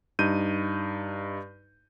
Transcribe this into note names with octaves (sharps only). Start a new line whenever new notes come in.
G2 D#4 G6 D#7